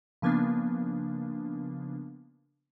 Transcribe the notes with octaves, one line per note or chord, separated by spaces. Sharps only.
C#3 F3 A#3 B3 D4